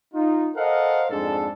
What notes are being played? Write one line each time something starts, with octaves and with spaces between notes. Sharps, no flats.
D#4 F4
A4 A#4 C5 D#5 F5 F#5
F2 G#2 G#3 D4 A4 A5